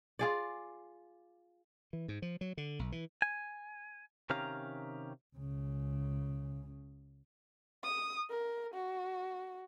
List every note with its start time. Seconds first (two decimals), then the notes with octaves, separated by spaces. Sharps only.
0.19 F4 G#4 D5
1.93 E3
2.08 G#2
2.22 F3
2.41 F#3
2.57 D3
2.79 B1
2.92 E3
3.22 G#5
4.30 C3 D#3 C#4 G4 F5 A#5
5.36 C#2 C#3
7.84 D#6
8.30 A#4
8.74 F#4